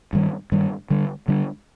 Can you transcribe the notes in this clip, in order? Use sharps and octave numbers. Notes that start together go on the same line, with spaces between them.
G2 D#3 G3
G2 D#3 G3
D3 G3 D4
D3 G3 D4